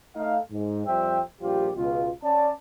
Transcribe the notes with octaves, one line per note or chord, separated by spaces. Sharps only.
A3 D#4 A4 F5
G#2
F2 G3 C5 E5 G5
A#1 F3 G3 F4 G4
C#2 B2 F4
C#4 D5 A5